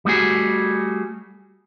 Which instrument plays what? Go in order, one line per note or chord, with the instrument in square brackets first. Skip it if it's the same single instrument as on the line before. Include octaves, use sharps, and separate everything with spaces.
[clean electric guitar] G3 A3 F#4 G#4